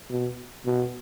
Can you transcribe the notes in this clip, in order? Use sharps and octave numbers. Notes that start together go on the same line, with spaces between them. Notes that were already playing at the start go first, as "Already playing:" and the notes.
B2
B2